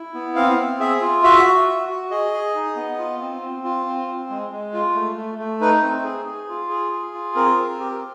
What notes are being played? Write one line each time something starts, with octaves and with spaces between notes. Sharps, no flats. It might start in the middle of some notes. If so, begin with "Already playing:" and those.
Already playing: E4
B3
C4 F5
C4
G#4 E5
F4
F#4 E5
F#4
F#4
F#4
G#4 D#5
G#4
D#4
B3
F4
C4
C4
F4
C4
C4
G#3
G#3
F4
A3
A3
A3
D#4 B4
C4
G#4
G#4
F4
G#4
G#4
F4
C4 A#4
C4
G4